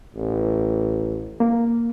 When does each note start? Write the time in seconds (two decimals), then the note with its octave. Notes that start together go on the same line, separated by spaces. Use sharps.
0.15 A1
1.40 A#3